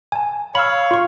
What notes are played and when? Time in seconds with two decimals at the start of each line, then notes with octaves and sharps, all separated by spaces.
0.12 G#5 A5
0.55 C#5 F5 B5 E6
0.91 F4 C#6